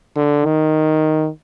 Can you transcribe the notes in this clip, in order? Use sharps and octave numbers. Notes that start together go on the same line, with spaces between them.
D3
D#3